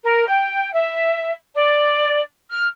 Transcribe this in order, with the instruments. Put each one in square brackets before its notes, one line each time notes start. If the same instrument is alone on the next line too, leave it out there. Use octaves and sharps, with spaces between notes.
[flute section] A#4
G5
E5
D5
F6